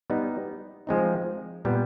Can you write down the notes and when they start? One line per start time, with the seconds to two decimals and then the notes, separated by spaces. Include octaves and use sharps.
0.10 G3 B3 D#4
0.87 F3 G#3 C4 D#4
1.65 A#2 G3 B3